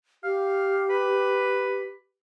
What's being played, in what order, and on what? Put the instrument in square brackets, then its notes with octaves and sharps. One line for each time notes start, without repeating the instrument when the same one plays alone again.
[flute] G4 [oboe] F5
[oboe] B4